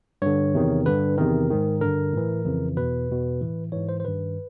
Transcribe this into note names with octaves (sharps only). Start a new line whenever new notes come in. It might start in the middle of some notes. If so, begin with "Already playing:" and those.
G2 D3 C#5
E2 C3 D#3
G2 D3 B4
E2 C3 D#3 A#4
G#2 D#3
G2 D3 A#4
A2 E3
F2 C#3 E3
E2 B2 B4
E2 B2
A2 E3
G#2 E3 C#5
C5
C5
G2 D#3 B4